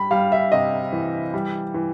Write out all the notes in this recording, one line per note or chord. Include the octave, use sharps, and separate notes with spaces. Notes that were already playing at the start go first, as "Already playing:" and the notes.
Already playing: G3 B5
G3 F5
E5
C3 D#5
E3
G3
E3